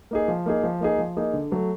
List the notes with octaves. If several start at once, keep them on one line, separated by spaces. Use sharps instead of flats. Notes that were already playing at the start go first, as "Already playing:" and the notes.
A#3 D#4 G#4
F3
A#3 D#4 G#4
F3
A#3 D#4 G#4
F3
A#3 D#4 G#4
D3
F#3 A3